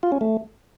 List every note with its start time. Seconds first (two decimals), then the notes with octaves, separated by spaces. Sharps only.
0.03 F4
0.12 C#4
0.21 A3